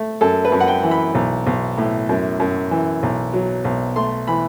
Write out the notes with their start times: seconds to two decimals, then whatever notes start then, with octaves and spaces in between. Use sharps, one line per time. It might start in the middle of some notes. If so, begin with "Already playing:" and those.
Already playing: A3
0.21 F#2 A4
0.45 B4
0.52 F#2
0.60 F#5
0.68 G5
0.83 E3
0.91 B5
1.15 B1
1.47 B1
1.78 A2
2.09 F#2
2.40 F#2
2.71 E3
3.03 B1
3.33 F#3
3.65 B1
3.96 A3 C6
4.27 E3 B5